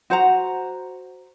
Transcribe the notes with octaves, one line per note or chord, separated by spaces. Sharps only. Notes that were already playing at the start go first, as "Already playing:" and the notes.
F#4 C5 F#5 A#5